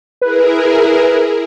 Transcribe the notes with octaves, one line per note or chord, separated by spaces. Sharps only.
E4 G#4 A#4 B4